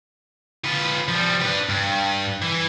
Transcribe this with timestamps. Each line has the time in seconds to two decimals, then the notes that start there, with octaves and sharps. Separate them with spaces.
0.64 F4 B4
1.08 F3 G3
1.42 D4 B4
1.69 G2
2.42 E3